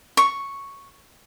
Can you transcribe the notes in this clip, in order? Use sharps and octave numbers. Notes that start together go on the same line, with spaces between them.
C#6